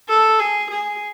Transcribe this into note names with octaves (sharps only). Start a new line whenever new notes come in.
A4
G#4
G#4